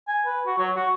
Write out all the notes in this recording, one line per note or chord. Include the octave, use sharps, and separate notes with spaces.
G#5
B4
F#4
F#3
F#4